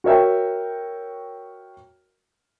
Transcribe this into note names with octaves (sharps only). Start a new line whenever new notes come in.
F#4 A#4 C#5 E5 G5